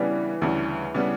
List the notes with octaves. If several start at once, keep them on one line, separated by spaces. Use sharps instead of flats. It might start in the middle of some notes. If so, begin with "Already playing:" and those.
Already playing: C#3 E3 G3 B3 D4
D2 C#3 E3 G3
C#3 G3 B3 D4